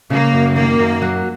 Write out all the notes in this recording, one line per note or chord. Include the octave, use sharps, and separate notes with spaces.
C#3 A#3
F#2
D#3 A#3
F#2
F#3